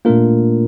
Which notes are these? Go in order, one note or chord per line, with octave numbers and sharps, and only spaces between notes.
A#2 A3 A#3 D4 F4 A#4